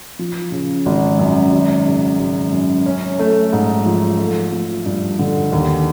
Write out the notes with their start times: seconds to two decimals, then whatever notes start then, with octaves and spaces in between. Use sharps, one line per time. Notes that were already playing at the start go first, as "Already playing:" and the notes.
0.19 F3
0.52 C#3
0.86 G#1
1.19 F#2
1.52 G#1
1.86 C#3
2.19 G#1
2.52 F#2
2.86 C#4
3.19 A3
3.53 G#2
3.86 F3
4.19 A3
4.52 F3
4.86 G2
5.19 D3
5.52 D#2